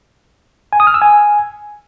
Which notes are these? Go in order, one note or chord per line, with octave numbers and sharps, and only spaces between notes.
G#5
D#6
F6
E6
G#5